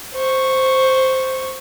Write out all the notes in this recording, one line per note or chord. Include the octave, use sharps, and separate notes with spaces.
C5 C#6